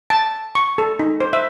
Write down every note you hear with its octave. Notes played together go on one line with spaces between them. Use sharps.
A5
C#6
A4
D#4
C5
E5